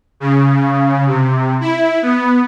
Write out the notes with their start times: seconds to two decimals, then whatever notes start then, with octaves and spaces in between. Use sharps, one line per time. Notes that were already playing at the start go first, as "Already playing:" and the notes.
0.20 C#3
1.07 C3
1.61 E4
2.02 B3